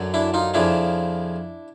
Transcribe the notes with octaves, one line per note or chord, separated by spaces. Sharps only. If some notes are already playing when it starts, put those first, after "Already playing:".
Already playing: F#2 D3 F#3
D4 E4
D#4 F4
F2 C#3 F3 D4 E4